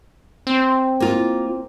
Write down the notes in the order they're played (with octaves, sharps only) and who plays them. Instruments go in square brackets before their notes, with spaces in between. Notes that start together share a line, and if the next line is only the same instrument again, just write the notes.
[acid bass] C4
[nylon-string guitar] A#3 F4